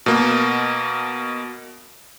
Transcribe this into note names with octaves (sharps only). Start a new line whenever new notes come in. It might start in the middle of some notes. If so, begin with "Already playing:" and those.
B2 A#3